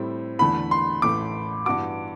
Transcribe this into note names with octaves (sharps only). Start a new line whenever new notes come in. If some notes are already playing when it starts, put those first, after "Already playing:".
Already playing: A2 G3 C4 E4
E2 D3 A3 E4 A4 B5
C6
A1 A2 E3 A3 D6
G2 E3 B3 F#4 D6